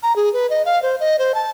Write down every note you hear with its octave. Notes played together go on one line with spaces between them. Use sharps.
A#5
G#4
B4
D#5
F5
C5
D#5
C5
A5